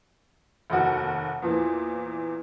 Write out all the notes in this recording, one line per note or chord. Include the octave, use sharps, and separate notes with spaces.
F1 D#2 F#4
E2 A#2 E3 F3